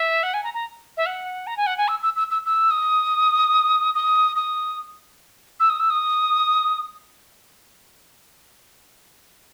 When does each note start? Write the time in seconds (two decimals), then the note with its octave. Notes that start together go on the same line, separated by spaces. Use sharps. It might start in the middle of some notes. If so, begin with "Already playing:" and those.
Already playing: E5
0.23 F#5
0.34 G#5
0.44 A#5
0.54 A#5
0.97 E5
1.06 F#5
1.47 A#5
1.57 G#5
1.66 F#5
1.78 G#5
1.88 E6
2.02 E6
2.16 E6
2.31 E6
2.46 E6
2.71 D#6
3.94 D#6
4.36 D#6
5.60 E6
5.70 D#6
5.79 E6
5.90 D#6